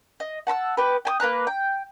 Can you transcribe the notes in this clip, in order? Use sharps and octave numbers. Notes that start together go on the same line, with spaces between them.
D#5
F#5 A5 B5 E6
B3 G4 B4
G5 G#5 D#6
A#3 B4 A#5 F#6
G5